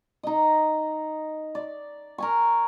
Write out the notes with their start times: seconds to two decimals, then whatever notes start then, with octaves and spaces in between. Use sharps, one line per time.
0.23 D#4 D#5
1.55 D5
2.18 A#4 G#5 C#6